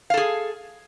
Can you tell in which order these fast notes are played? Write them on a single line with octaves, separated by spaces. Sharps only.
F5 A4 G#4